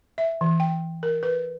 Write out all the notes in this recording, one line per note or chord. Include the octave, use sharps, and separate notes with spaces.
E5
E3
G5
A#4
B4